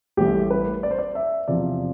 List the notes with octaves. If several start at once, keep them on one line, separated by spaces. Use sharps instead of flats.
A1 A2 G3 G4
B4
D5
C5
D5
E5
E2 C3 F3 D5